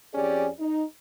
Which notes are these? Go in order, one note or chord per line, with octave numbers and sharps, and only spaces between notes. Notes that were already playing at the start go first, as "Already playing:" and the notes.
F2 C#4 G4 G#4 D5
D#4